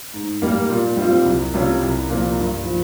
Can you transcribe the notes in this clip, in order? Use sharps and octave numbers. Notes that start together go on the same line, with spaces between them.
G#2
G3 A#3
A#2
G3 C4 F4
C2
C3 G3 C#4 F4
C2
A#2 F3 A#3
G2
F3